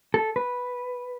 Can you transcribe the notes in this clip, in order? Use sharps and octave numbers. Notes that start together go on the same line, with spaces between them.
A4
B4